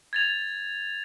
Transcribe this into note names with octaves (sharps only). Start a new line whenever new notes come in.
G#6 A6 F7